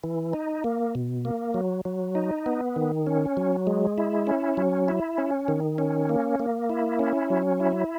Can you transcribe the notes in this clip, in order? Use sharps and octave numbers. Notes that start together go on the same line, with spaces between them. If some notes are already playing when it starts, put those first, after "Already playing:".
E3
D#4
A#3
B2
A#3
F#3
F#3
D#4
B3
D#3
C#4
F#3
G#3
E4
C#4
F#3
E4
C#4
D#3
C#4
A#3
A#3
E4
C#4
F#3
E4